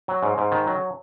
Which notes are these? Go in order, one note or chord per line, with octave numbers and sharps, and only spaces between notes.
F#3
G#2
G#2
D#3
F#3